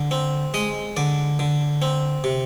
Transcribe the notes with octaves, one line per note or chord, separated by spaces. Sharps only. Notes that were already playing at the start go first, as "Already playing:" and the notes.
Already playing: D3
C4
G#3 D#5
D3 D5
D3
C4
C3